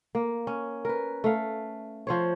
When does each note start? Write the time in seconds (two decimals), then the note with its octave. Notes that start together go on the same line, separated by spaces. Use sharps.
0.15 A#3
0.47 C#4
0.85 A#4 B4
1.24 A3 F5
2.07 F3 C5 C#5